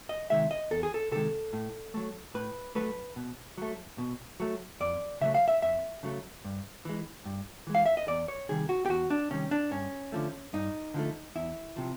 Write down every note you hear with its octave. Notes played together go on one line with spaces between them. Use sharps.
D#5
C3 D#3 G#3 E5
D#5
E2 A4
G#4
A4
C3 D#3 G#3 A4
A2
F#3 A3
A2 B4
F#3 A3 B4
B2
F#3 A3
B2
F#3 A3
F2 D5
C#3 F#3 A3 E5
F5
E5
F2 E5
C#3 F#3 A3
G2
E3 G#3
G2
E3 G#3
F5
E5
D#5
E2 D5
C#5
C3 D#3 G3 G#4
F#4
G4
E2 F#4
D4
C3 D#3 G3 C#4
D4
G2 C#4
D3 F3 A3
G2 D#4
D3 F3 A3
E2 E4
C3 F3